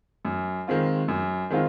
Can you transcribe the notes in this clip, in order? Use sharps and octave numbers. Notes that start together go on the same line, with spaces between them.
F#2
D#3 G#3 C4 F4
F#2
D#3 G#3 C4 F4